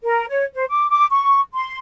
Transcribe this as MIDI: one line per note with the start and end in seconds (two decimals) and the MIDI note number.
0.03 0.25 70
0.29 0.44 73
0.54 0.65 72
0.70 0.89 86
0.90 1.06 86
1.11 1.40 85
1.54 1.78 84